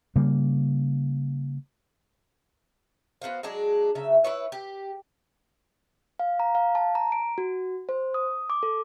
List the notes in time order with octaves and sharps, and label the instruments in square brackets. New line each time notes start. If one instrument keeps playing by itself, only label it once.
[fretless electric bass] C#3 G3 A#3
[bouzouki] B3 F#4 C5 F5
F#3 G#3 D4 G#4
C#3 F#3 E5
E4 B4 C#5
G4
[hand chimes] F5
A#5
F5
A5
A#5
D7
F#4
C5
D#6
D6
A4